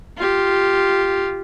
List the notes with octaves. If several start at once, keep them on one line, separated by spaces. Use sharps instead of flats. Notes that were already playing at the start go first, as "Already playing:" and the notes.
F4 G4